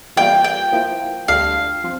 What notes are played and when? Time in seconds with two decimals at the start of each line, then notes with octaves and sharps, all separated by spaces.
0.17 E3 G3 A#3 F4 G5
0.44 G5
0.72 F3 A#3 E4
1.28 D2 D3 G3 D4 F4 F5
1.84 F3 C4